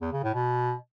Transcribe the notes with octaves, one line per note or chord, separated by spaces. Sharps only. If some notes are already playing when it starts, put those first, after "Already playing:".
E2
C#3
A2
B2